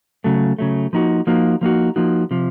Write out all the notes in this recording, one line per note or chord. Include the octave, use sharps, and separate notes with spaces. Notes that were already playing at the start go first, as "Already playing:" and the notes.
C#3 F#3 A3
C#3 F#3 A3
F3 A#3 D#4 F#4
F3 A#3 D#4 F#4
F3 A#3 D#4 F#4
F3 A#3 D#4 F#4
C3 F3